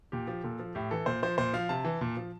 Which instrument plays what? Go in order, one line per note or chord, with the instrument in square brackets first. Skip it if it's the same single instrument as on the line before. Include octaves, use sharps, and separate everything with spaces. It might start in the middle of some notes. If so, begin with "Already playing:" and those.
[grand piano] A#2 G4
F3
A#2 A4
F3
A2 G4
E3 A4
A#2 C5
F3 C5
A#2 C5
F3 F5
C3 A5
E3
A#2
F3